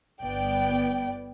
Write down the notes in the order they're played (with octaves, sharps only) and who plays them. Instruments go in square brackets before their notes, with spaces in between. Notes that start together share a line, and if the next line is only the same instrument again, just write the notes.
[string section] G1 B3 D5 G5